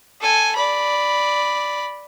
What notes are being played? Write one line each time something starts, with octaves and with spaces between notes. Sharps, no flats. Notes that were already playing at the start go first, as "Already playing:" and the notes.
A4 G#5
D5 B5